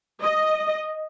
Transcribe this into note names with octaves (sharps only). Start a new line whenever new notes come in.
D#5